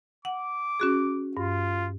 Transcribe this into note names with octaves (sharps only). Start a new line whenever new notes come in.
F#5 D6
C#4 F#4 G#4
G2 F4